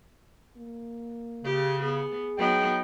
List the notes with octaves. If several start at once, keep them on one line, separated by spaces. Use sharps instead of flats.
A#3
C#3 G4
B3 G#4
F#3 B3 D#4 G5